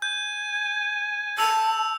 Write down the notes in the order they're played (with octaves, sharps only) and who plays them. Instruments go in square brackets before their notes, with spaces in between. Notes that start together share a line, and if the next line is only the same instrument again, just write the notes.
[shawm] G#5 [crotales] G6
[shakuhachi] A5 [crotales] E6 F7